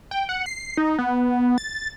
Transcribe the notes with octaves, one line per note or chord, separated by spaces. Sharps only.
G5
F#5
C7
D#4
B3
A6